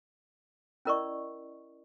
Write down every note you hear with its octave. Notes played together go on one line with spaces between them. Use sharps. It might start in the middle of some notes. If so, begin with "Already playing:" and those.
C#4 E4 A#4 D5 D#5 C#6